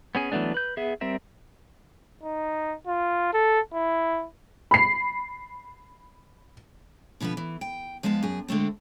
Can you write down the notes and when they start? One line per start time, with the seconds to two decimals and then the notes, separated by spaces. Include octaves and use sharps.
0.15 B3 C#4 G#4
0.32 E3 F#3 A3 B3 D4
0.54 B4 G6
0.77 B3 G#4 E5
1.01 G3 C4 A#4 E5
2.23 D#4
2.87 F4
3.33 A4
3.74 E4
4.71 B5 C7
7.20 B2 D3 F3 B3 B4
7.37 E3
7.61 G5
8.03 F3 G#3 B3 F5 A5
8.23 F#2 G#4
8.48 D3 G#3 A3 C4